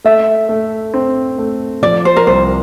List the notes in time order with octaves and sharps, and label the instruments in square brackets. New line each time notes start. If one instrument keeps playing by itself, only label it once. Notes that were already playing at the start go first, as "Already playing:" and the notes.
[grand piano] A3 [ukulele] E5
[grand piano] A3
C4
A3
[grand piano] F3 [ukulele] D5
[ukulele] C5
A#4
[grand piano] C2 [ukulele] C5